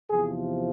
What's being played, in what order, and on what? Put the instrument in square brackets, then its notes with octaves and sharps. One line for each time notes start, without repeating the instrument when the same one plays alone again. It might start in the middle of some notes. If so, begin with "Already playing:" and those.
[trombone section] E2 C3 F3 G#4